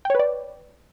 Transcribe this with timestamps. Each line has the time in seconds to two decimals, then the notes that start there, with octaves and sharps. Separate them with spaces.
0.05 G5
0.10 C#5
0.15 B4
0.19 D5